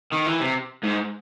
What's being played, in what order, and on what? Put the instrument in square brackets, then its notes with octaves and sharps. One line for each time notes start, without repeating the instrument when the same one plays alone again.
[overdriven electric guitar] D#3
E3
C3
G#2